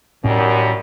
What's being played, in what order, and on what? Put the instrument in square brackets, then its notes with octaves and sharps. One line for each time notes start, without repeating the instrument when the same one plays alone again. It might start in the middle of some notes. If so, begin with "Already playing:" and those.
[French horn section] F#2 D#3 G3 [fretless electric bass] A2 C#4